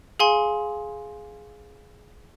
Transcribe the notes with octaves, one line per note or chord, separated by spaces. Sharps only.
G#4 F5 G#5 C6